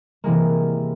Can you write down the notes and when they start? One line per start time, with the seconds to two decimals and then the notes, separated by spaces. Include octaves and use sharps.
0.24 C3 E3 G#3 A#3